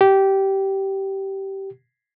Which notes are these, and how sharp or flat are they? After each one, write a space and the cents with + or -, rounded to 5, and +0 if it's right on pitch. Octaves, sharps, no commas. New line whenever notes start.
G4 -15